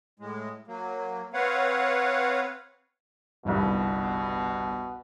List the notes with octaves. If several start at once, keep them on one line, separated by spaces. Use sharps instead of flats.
A2 G#3
F#3 A#3
C4 B4 C#5 F5 F#5
G1 C2 B2